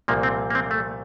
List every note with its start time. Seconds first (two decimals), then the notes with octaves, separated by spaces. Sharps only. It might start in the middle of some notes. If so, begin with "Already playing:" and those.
0.08 C2 A#2 F3 A#3
0.23 C4
0.50 A#3
0.55 C4
0.71 A3